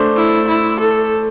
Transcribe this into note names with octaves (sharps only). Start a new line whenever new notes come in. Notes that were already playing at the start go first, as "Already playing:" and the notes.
Already playing: A3 D4 C5
E4
E4
A4